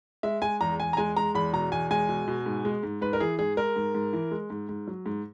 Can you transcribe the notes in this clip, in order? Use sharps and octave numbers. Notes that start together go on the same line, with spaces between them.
G#3 E5
G#3 G#5
E2 A#5
E2 G#5
A#5
G#3 G#5
G#3 A#5
E2 B5
B2 A#5
E2 G#5
G#3 G#5
B2
B2
G#2
G#3
G#2
G#2 B4
A#4
E3 G#4
G#2 G#4
G#3 A#4
G#2
G#2
E3
G#3
G#2
G#2
F#3
G#2